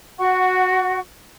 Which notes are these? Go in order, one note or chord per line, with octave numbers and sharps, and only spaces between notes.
F#4 F#5 C#6